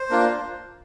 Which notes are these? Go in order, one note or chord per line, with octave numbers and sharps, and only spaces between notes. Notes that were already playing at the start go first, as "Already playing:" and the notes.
Already playing: C5
A#3 D4 F4